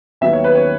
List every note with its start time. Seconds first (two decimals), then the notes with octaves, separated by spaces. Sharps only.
0.21 D#2 D#3 F#3 B3 E5
0.33 C#5
0.44 B4
0.55 C#5